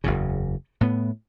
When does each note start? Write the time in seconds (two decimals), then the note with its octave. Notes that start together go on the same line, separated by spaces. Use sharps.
0.04 F#1 E2 C#3
0.81 A2 B3